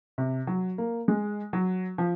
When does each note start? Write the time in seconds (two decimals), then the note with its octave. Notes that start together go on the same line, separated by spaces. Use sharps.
0.18 C3
0.47 F#3
0.78 A#3
1.08 G#3
1.53 F#3
1.98 F3